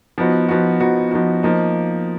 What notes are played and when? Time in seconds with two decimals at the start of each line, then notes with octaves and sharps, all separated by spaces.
0.18 F3 B3 D#4 F#4
0.49 F3 B3 D#4 F#4
0.80 F3 B3 D#4 F#4
1.11 F3 B3 D#4 F#4
1.43 F3 A#3 D#4